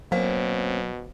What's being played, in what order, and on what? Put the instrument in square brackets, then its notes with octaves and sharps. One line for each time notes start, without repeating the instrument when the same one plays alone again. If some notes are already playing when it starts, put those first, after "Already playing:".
[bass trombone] B2 [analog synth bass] F#3 [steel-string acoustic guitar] A#3 C4 C#4 [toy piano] C5 F5